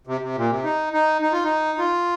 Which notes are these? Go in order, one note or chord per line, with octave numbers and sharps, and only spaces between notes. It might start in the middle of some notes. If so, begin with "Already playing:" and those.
C3
C3
A#2
C3
D#4
D#4
D#4
F4
D#4
F4